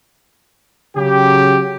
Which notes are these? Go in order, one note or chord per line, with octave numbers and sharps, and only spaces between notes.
C#3 F#3 G4